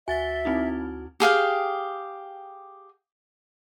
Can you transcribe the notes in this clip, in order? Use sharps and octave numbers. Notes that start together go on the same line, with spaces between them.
D2 F#4 E5 G#5 A6 G7
C4 D#4 E4
G4 G#4 F5 G5